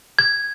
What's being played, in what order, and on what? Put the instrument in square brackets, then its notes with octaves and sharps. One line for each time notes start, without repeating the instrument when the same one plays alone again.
[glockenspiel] G#6